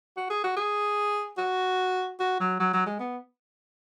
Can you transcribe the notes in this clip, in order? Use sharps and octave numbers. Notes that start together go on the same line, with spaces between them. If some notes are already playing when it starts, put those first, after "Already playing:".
F#4
G#4
F#4
G#4
F#4
F#4
F#3
F#3
F#3
G#3
B3